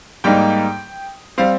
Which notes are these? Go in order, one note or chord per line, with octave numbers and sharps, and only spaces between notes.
G#2 G3 A#3 D#4 G5
G3 C4 F5